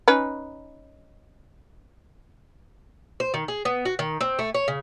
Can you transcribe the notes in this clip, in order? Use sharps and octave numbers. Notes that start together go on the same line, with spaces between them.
C#4 D#4 B4
C5
D#3
G#4
B3
F#4
D#3
C4
A3
C#5
C#3